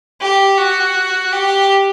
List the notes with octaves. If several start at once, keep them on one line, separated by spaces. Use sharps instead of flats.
G4
F#4
G4